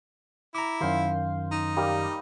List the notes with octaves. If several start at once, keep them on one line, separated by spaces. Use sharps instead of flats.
E4 A#5 D6
F#2 D#3 C5 F5 C6
D#4
G3 A#3